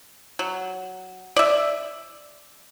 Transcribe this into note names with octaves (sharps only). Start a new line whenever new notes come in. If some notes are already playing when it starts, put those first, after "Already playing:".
F#3
D5 E5